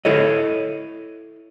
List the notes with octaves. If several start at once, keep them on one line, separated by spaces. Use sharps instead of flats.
E4 A4 C#5 D#5